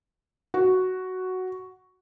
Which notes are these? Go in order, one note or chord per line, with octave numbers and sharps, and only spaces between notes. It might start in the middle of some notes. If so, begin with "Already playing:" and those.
F#4